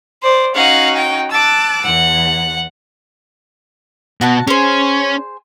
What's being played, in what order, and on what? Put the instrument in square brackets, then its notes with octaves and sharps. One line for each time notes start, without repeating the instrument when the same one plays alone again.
[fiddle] C5 D5
[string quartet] C#4 D#4 F#4 [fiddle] F5 F#5
[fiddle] G5
[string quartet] A5 D6 F#6 [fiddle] E6
[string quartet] E2 [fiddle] F#5
[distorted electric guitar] B2 [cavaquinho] F#4 F#5 A5
[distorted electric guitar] C#4 [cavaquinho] G#4 C5